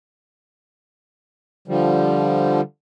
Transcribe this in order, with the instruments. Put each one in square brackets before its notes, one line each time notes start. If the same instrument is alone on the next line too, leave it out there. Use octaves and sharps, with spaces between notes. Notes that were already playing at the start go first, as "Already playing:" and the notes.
[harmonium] D3 F3 G3